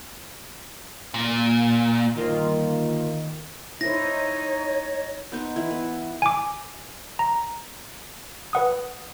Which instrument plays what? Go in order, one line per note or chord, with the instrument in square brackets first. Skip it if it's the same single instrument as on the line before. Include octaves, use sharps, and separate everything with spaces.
[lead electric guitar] A#2
[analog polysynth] G1 A#3 F4 [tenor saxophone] D#3
[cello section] D#4 [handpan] E4 C5 [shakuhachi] C#5 [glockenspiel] A#6
[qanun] B3 D#4 C5
E3 E4
B3
[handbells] G#5 D6
A#5
B4 F#5 D#6